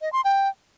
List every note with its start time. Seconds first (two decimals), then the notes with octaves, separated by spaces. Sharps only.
0.01 D#5
0.13 C6
0.25 G5